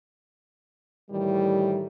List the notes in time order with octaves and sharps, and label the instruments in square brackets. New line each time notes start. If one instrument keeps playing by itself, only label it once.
[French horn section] A2 D#3 E3 G3